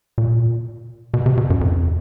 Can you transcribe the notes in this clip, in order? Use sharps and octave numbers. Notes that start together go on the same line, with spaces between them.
A#2
B2
C3
B2
F#2
F2